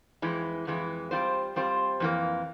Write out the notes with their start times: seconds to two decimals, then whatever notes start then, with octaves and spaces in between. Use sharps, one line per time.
0.22 F2 E3 G#3 E4
0.67 F2 E3 G#3 E4
1.11 G3 C4 F4 C5
1.56 G3 C4 F4 C5
2.00 F2 E3 A#3